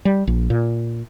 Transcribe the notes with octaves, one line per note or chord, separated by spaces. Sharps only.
G3
A#1
A#2